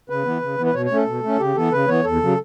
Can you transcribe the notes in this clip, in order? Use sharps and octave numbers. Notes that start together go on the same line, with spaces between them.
C#3 B4
E3 B3
C#3
E3 B3
B4
B2 C#5
C#5
A3 C#4 A4
B2
A3 C#4
C#3 G4
E3 B3 A4
C#3 B4
E3 B3 C#5
E2 A4
C#3 F#3